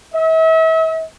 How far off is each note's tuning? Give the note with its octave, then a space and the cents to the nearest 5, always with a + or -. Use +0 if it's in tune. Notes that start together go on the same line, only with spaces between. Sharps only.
E5 -40